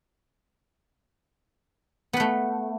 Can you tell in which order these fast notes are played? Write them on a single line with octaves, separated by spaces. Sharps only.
B3 B4 A3